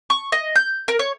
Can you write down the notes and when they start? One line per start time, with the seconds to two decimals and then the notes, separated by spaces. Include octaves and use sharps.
0.10 C#6
0.32 D#5
0.55 G6
0.88 A#4
0.99 C#5